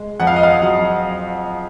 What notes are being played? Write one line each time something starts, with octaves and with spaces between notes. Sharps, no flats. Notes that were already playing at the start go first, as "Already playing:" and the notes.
Already playing: G#3
F2 F#5
F5
D#5
F5
F#3 F#5